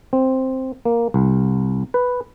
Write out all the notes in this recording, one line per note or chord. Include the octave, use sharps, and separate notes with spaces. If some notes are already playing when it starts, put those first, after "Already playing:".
C4
A#3
C2
B4